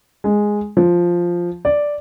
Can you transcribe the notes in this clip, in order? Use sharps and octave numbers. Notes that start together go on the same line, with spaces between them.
G#3
F3
D5